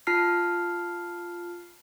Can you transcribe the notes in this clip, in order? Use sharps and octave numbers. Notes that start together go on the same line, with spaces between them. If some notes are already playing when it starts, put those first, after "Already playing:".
F4 A5 F6 C7